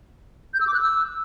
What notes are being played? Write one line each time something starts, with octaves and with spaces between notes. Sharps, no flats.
G6
E6
D6
F#6
E6